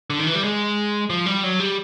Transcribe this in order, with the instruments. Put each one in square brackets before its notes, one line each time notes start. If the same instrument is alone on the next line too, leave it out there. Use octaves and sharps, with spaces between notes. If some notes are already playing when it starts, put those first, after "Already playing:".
[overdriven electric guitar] D3
D#3
E3
G3
G#3
F3
G3
F#3
G3